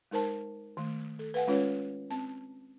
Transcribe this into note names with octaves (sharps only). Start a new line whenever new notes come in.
G#3 D#4 A#4 C5 A5
D#3 A3
A4
B4 F5 F#5 G#5
G#3 C#4 F4 B4 C#5
C4 A5